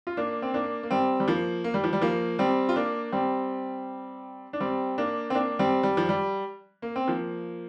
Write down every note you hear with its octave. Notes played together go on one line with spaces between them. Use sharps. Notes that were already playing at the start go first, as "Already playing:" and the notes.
F4
A#3 D4
C4
A#3 D4
A#3
G3 C4
G3
F3 A#3
A#3
G3
F3
G3
F3 A#3
G3 C4
F4
A#3 D4
G3 C4
D4
G3 C4
A#3 D4
C4
A#3 D4
G3 C4
G3
F3
G3
A#3
C4
F3 A#3